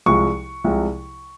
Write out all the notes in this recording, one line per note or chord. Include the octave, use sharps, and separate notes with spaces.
C2 C3 F3 G#3 C#6
C2 C3 F3 G#3